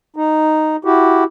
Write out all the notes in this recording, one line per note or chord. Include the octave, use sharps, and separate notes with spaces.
D#4
E4 F#4 G4